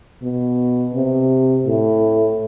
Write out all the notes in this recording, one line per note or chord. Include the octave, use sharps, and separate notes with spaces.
B2
C3
A2